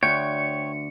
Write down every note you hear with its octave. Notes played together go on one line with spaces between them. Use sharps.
D2 C#5 G5 C#7